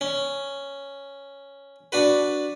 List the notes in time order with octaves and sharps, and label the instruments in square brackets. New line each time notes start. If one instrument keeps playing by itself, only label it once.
[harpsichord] C#4
D4 F#4 B4